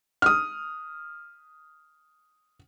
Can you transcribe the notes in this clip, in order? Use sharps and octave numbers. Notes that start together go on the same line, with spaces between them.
D#6 F6